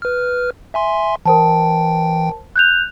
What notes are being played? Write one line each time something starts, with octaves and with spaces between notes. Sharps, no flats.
B4 F6
E5 G#5 C6
E3 A#4 C5 G5 A5
F#6 G6 F7